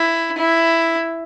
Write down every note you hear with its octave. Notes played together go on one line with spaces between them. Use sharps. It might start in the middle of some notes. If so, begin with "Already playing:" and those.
Already playing: E4
E4